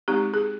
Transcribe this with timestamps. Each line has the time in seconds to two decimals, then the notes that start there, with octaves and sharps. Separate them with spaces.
0.08 G#3 C4 D#4 G4
0.34 G#4